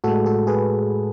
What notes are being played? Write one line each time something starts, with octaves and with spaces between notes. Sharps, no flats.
A2 G#3 F#4 A4
F#4 A4
G#4 B4